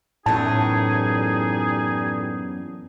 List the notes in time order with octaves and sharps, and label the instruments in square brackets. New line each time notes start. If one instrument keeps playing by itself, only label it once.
[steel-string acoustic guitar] F#2 E3 B3 [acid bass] A2 [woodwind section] G3 D#4 G#4 [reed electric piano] A5